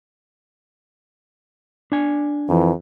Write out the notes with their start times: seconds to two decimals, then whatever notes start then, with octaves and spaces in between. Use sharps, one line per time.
1.92 D4 G#5
2.49 F2 E3